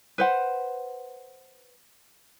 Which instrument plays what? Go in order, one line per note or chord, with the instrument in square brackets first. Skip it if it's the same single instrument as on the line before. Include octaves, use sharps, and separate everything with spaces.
[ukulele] B4 C5 F#5